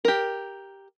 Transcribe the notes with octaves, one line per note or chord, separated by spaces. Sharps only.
G4 A#4